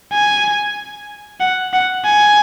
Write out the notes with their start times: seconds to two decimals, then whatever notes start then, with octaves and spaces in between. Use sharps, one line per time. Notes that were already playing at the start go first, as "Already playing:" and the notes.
0.13 G#5
1.40 F#5
1.73 F#5
2.05 G#5